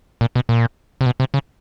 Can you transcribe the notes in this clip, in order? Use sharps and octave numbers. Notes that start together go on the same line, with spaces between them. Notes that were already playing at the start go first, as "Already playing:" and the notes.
A#2
B2
A#2
C3
B2
C3
C#3